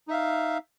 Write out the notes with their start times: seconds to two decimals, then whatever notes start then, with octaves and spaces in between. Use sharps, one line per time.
0.08 D#4
0.10 E5
0.13 F5